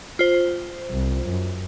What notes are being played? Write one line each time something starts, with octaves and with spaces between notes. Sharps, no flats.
F4 C5
C2
F#2